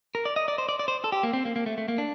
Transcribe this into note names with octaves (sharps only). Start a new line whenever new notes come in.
A#4
D5
D#5
D5
C5
D5
D5
C5
A4
G4
A#3
C4
A#3
A#3
A3
A3
A#3
D4